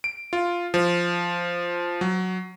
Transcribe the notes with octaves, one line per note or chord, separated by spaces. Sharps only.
D7
F4
F3
F#3